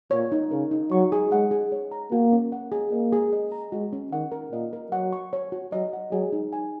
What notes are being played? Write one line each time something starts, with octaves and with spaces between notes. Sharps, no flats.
A#2 C#5
D#4
C#3 A#4
D#4
F#3 C#6
G#4
G#3 F#5
G#4
C#5
A#5
A#3 F#4
C#4
F#5
G#4
A#3 D#5
G#4
D#5
A#5
G#3 F#4
C#4
D#3 F#5
A#4
A#2 D#5
A#4
F#3 F#5
C#6
C#5
F#4
F#3 D#5
F#5
F#3 G#4
D#4
G#5